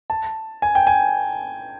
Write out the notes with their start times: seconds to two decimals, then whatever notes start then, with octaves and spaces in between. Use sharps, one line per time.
0.10 A5
0.62 G#5
0.75 G5
0.87 G#5